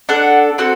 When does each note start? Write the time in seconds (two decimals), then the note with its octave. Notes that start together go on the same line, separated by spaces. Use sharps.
0.09 D4 A4 F#5
0.58 C4 F#4 A4